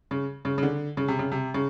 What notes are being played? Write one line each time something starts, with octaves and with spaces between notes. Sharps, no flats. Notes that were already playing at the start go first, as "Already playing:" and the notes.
C#3
C#3
C#3
D3
C#3
C3
C#3
C3
C#3